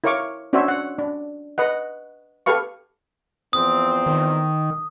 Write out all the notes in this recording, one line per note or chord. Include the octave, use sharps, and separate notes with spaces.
E4 A#4 C#5 F5 C#6 D6
C#4 D4 F#4 C5 C#5 E5
F#5
D4
B4 D#5 F#5
G4 A4 B4 F5 C#6
E2 F3 C4 D#6
D#3